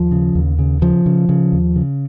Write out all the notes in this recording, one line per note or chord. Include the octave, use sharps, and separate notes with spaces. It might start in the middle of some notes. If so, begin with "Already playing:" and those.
Already playing: D#2 F3
C#3
D#2
C#3
C#3 F3
C#3
C#3
D#2
C#3